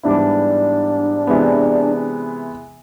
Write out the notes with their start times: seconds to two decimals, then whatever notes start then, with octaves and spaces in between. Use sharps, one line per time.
0.03 G#2 E3 G3 B3 D4 E4
1.27 C3 E3 G#3 B3